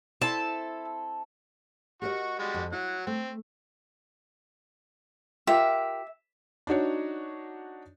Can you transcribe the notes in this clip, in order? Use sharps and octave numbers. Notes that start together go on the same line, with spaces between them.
C4 E4 A4 A5
F#4 G4 A#4 D#5 C#6
G3 G#3 F#4
F2
F#3 E4 F#5
A3 C4
F4 G4 A#4 E5
D4 D#4 F#4 C#5